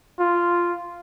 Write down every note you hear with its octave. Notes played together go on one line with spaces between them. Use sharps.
F4